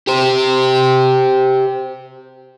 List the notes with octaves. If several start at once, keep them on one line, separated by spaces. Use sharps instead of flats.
G4 C5